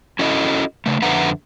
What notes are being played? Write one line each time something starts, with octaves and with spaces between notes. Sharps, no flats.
C#4 E4 F#4 A4 D#5
C#3 A3
F2 D3 B4 E5 F#5 A#5